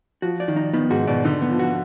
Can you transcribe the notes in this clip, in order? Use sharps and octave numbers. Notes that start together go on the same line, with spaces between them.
F3 F#4
D5
D#3
D#4
D#3 B3
G#2 F#4
B2 D5
D3 D#4
B3
F3
F#4